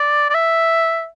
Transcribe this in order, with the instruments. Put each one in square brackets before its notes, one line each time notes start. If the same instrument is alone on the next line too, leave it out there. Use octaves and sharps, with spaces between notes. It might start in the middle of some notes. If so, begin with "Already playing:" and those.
Already playing: [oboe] D5
D5
E5